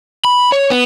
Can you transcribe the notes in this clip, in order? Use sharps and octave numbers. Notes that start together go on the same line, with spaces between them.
B5
C#5
B3